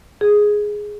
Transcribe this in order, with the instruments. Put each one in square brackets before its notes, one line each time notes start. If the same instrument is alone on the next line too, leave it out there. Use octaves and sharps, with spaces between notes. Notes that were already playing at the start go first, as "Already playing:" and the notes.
[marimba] G#4